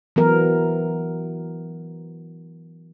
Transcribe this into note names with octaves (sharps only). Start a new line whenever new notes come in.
E3 F#3 B3 A#4